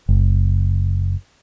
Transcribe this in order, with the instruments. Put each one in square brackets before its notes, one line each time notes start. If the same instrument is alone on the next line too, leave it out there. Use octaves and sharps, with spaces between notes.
[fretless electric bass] F#1